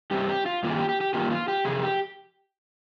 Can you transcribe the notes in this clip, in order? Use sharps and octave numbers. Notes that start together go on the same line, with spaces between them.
G2 G3 C4 G4
G4
F4
G2 D#3 A#3 F4
G#4
G4
G4
G4
G2 D#3 A#3 F4 G4
F4
G4
F2 C3 G#4
G4